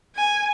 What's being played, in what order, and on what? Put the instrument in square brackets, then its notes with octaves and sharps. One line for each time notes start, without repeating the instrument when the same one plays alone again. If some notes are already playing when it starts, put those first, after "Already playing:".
[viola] G#5